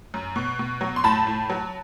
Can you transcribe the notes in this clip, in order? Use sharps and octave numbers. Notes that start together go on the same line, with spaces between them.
F#2
B2
B2
F#3
C6
A2 A5 B5
A2
F#3